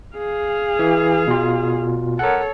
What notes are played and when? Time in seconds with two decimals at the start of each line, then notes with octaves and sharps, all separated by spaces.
0.17 G#4 F5
0.79 E3
1.27 B2 F4
2.19 A4 A#4 C#5 F#5